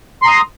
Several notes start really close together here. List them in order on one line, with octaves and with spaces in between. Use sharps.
C6 A#5 D#6